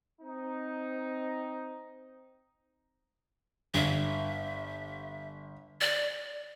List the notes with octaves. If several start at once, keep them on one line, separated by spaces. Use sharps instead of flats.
C4 D#4
G1 E5
D5